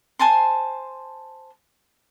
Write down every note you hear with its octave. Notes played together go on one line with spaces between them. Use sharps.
C5 G#5 A5 C6